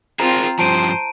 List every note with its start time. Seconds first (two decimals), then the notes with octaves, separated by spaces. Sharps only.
0.20 C4 F4 G#4 A#4 C5 A#5
0.59 G2 F3 C5 A5 D7 D#7